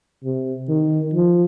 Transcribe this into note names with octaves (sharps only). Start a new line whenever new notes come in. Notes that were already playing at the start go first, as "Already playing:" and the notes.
C3
D#3
F3